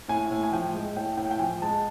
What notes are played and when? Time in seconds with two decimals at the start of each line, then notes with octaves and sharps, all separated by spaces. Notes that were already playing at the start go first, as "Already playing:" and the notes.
0.08 A2 G#5
0.31 A2
0.43 G#5
0.52 F3 G5
0.74 G#3
0.96 A2 G5
1.17 A2 G5
1.31 G5
1.39 F3 G#5
1.62 G#3 A5